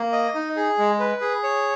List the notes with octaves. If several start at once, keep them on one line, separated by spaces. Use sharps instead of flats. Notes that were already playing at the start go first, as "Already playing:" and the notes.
Already playing: A#3
D#5
D#4
G#4
G#3
B4
G#4
C#5